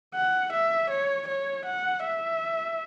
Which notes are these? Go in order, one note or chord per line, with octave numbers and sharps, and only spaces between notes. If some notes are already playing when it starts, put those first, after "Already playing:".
F#5
E5
C#5
C#5
F#5
E5